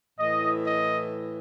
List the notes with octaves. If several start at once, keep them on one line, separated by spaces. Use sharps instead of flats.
A2 E3 D#5
D#5